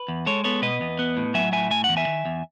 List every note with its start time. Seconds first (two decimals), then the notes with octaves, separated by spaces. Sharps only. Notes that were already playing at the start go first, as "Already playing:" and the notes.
Already playing: B4
0.08 E2
0.26 G#3 A4 C#5
0.44 B3 A4 C#5
0.62 B2 B4 D#5
0.81 E2
0.99 B3
1.17 A2
1.34 F#3 E5 G#5
1.52 A2 E5 G#5
1.71 A3 G#5
1.84 F#5
1.89 E2
1.97 E5 G#5
2.07 D#3
2.25 E2